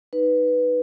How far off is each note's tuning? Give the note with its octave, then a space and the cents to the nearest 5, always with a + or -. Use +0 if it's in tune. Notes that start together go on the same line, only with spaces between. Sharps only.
D#4 +0 B4 +0